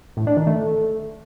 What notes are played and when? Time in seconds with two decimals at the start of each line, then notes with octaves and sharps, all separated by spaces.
0.17 A2
0.27 D4
0.37 D#3
0.47 A3